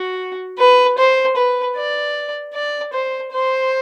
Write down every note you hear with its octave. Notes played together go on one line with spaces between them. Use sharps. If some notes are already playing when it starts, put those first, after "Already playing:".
Already playing: F#4
B4
C5
B4
D5
D5
C5
C5